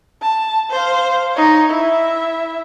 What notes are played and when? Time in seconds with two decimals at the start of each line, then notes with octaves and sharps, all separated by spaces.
0.22 A5
0.71 C5 F5
1.35 D#4 C#5
1.70 E4 E5